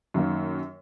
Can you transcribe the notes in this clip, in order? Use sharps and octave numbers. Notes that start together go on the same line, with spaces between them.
F#2 D#3 A#3